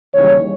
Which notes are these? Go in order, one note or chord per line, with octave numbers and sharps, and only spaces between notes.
D#2 C#3 E3 G3 C#5